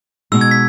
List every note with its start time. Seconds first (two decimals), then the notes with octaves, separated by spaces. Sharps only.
0.32 B2 G#3 D#4 E6
0.41 G#6
0.51 B6